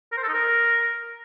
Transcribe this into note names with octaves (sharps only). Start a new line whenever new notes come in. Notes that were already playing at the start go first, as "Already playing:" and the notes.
A#4
C5
A4
D#4
A#4